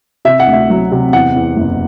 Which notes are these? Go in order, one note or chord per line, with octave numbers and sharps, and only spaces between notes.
C3 E5
F#5
D2
E5
F#3
C3
E2 F#5
E2
F#1